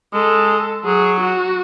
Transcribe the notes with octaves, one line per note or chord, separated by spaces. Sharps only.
G#3 A4
F#3 G#4
F#4